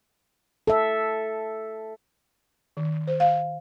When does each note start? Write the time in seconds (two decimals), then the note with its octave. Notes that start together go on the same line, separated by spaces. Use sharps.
0.67 A4 E5
2.77 D#3
3.07 C5
3.20 F5